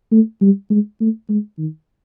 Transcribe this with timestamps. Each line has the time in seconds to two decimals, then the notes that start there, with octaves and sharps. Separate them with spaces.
0.12 A3
0.42 G3
0.70 G#3
1.00 A3
1.29 G#3
1.58 D#3